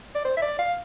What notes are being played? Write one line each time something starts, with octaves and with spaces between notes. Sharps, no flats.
D5
C5
E5
D5
F5